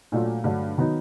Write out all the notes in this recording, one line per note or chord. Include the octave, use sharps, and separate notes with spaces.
A#2 F#3 A3 D4 F4
G2 D3 F#3 A3 D4
D#3 F#3 B3 D#4